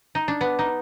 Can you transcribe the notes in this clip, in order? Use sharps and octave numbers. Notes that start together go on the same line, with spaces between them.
D#4
D4
B3
D#4